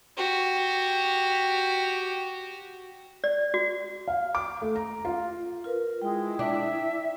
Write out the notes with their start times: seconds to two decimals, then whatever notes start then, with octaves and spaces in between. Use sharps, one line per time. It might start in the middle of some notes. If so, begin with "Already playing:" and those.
0.17 F#4 G4
3.24 D5
3.54 F#4
4.08 F5
4.35 D6
4.62 A3
4.75 A#5
5.05 F4
5.64 F4 A#4 B4
6.02 G#3 E4 G5
6.39 D4 E5